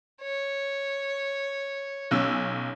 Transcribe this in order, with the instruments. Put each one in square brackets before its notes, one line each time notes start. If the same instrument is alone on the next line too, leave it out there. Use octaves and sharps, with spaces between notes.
[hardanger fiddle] C#5
[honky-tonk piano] B1 C#4 E6